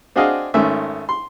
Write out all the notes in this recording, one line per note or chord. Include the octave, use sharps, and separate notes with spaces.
C4 D4 F#4 G#4 D#5 F5
G#1 D#3 A3 C#4 E5
C6